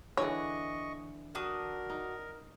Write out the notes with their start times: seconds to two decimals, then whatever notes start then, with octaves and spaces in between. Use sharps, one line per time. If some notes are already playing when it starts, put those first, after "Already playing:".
0.17 D3 E3 G#4 C#5 D#5 C#6
1.35 D4 F#4 A#4 D#6
1.90 D#4